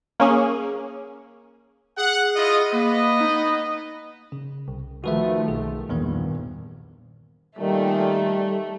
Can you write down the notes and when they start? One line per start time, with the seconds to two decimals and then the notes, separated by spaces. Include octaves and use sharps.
0.20 A#3 C#4 G#4
1.97 G#4 F#5
2.36 E4 F4 D#5
2.72 A#3 B3 B4 D#5
3.21 D#4
4.32 C#3
4.68 C2
5.04 D#3 F3 A3 F#4 B4 E5
5.48 B1 G#4
5.89 A#1 E2 G2 A#2 D#3 B3
7.59 A#2 D#3 G3 A3